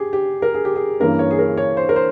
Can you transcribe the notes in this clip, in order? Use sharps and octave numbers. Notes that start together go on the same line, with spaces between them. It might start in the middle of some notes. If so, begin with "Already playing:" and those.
Already playing: G4 G#4
G4
A#4
G#4
G4
G#4
G2 E3 A#3 C#4 A#4
C#5
G#4
A#4
C#5
C5
A#4
C5